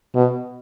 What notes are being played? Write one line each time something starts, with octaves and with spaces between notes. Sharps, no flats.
B2